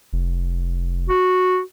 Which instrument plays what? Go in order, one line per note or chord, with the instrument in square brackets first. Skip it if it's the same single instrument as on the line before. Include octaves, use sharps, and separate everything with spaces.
[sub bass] F1
[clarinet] F#4